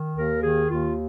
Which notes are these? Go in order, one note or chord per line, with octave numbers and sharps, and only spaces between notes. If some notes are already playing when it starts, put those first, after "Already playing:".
Already playing: D#3
D#2 A#4
D#3 G#4
D#2 F4